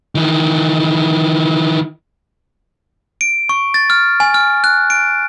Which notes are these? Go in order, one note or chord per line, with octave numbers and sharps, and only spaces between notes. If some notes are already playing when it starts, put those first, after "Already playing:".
D#3 E3
D7
C#6
A6
F6
G#5
F6
F#6
D7